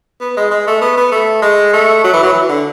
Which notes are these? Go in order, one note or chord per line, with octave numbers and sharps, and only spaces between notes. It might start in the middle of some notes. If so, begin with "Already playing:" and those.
B3
G#3
G#3
A3
B3
B3
A3
G#3
A3
F#3
E3
F#3
E3
D3